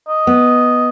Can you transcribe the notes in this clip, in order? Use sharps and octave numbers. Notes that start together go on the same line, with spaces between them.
D#5
B3